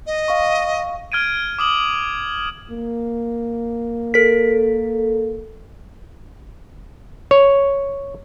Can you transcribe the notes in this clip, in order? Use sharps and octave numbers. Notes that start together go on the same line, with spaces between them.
D#5
F5 C#6
F6 G#6 D7 D#7
D6 D#6 F#7
A#3
A4 A#4 B6
C#5